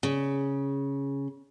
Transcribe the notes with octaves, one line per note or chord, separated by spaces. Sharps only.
C#3